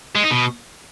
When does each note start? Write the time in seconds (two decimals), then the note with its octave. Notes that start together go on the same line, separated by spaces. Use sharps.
0.15 G#3
0.23 D#4
0.31 B2